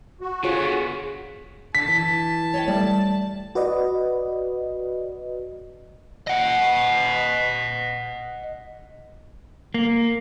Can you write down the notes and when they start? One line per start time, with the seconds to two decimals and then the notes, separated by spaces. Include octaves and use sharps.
0.21 F#4
0.44 D3 B3 F4 G#4 C#5
1.75 D3 A5 B6
1.88 E3
2.54 C#5 D#5 G5
2.68 G3 A3 D5
3.55 F#4 B4 D5 D#5
6.28 D#5 F#5
9.74 A#3